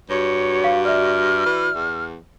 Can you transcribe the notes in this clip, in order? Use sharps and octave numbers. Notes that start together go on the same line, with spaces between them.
G2 F#4 C#5
F5 C#6
D5 E5 F6
E3
E2